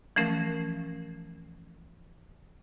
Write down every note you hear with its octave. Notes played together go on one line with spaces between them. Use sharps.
E3 F3 A3 C#4 A#4